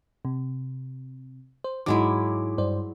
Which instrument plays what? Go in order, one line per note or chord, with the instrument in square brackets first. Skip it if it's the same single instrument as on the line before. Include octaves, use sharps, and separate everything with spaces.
[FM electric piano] C3
C5
[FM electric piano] G#2 D#4 D6 [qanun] F#3 G#3 E4
[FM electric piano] G2 C5 D5